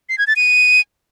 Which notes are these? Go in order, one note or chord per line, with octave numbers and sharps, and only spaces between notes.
C7
G#6
A6
D#7